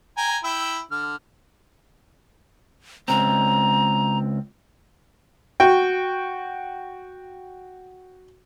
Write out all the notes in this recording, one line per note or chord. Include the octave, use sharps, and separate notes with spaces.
G5 G#5 A#5
E4 G5 E6
D3 F6
C#2 C4 A#5
F#4 G5